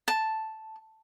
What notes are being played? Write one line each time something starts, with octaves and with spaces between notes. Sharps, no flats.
A5